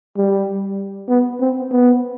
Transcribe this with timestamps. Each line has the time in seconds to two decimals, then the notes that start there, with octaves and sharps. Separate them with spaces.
0.17 G3
1.09 B3
1.40 C4
1.72 B3